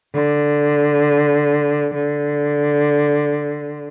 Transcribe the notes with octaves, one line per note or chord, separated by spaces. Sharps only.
D3
D3